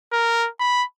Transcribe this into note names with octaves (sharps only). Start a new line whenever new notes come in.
A#4
B5